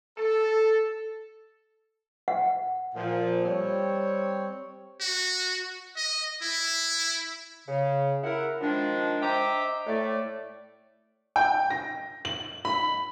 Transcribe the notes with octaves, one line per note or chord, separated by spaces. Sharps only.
A4
F#5
A#2 F3
G3 C4 C#5
F#4
D#5
E4
C#3
E4 A#4 F#5
D#3 F3 G#3 D4
C5 D#5 E5 G5 A#5 D6
A2 A3 D5
G5
A#6
F#7
B5